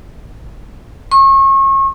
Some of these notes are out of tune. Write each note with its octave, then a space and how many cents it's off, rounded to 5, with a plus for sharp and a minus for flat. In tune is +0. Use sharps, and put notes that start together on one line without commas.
C#6 -35